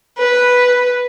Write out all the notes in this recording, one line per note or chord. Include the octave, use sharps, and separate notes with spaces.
B4